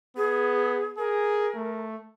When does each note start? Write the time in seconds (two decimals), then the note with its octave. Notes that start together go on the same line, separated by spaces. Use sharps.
0.17 B3 G#4
0.98 G#4 A#4
1.56 A3